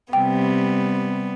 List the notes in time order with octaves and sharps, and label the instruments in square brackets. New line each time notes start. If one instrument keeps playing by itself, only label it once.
[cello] C3 [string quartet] G3 B3 [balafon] G5